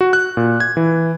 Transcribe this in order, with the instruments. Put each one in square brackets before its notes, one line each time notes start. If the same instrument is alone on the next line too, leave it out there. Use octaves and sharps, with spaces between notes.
[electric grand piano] F#4
F#6
A#2
G#6
E3